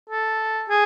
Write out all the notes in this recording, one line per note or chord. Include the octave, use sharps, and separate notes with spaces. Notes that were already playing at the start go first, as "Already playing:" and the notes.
A4
G#4